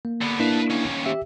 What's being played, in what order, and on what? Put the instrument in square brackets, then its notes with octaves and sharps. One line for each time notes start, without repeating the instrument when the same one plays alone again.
[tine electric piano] A#3
[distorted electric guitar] D3 B3
[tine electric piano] A#3 D4 E4 [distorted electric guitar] B4 A5
[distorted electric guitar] D#2 C#4
[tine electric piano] G4 E5